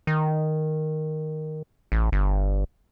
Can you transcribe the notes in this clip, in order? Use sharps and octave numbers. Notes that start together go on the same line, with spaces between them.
D#3
A1
G1